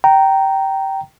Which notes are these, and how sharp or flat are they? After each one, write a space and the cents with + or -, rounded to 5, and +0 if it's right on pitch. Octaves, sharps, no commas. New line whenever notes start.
G5 -15 A#5 -5